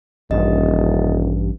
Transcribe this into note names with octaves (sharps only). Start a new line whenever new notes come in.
D#1 A1 G2 D#5